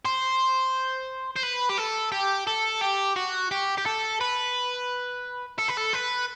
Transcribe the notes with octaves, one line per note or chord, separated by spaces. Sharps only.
C5
C5
B4
G4
A4
G4
A4
G4
F#4
G4
G4
A4
B4
A4
B4
A4
B4